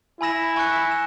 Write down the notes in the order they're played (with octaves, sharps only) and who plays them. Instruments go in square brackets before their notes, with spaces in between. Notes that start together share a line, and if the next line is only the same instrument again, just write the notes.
[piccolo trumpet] E4 [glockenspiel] G#5 B5 E6 A#6 E7
[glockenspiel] G#5 C#6 F#6 C#7
E7